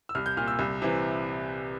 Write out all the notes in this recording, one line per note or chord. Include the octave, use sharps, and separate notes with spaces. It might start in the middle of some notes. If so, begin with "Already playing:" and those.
E6
C2 F6
G6
A#2 F6
E6
C2
C3 E3